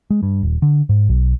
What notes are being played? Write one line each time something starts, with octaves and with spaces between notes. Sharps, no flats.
G#3
G2
D#1
D3
G#2
B1